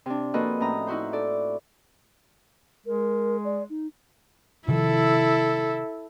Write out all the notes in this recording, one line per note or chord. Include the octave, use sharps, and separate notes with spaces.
C3 D4
F3 A#3 F#4 A4 B4 D#5
A2 C#4 A#5 D#6
D#4 E4 F#4 C5
A4 D5
G#3 A#4
D5
D#4
C3 D#3 F3 E4 A4